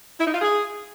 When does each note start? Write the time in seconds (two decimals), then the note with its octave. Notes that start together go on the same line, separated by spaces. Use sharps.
0.19 E4
0.27 D#4
0.34 F4
0.42 G#4